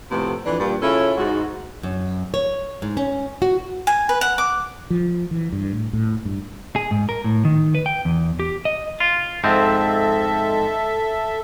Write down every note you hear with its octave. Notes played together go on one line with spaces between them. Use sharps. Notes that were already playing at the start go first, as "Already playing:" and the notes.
F2 A2 C3 A3 B3
F2 E3 D4
G2 A#2
C#3 C#4 E4 F4 A4 E5
G#2 F#4
F#2
C#5
G#2
C#4
F#4
G#5
B4
F#5
D6
F3
E3
G2
A2
A2
G2
G#4
G#2
A#4
A2
D#3
B4
G5
E2
G4
D#5
F4
G#2 F3 C4 A4 E5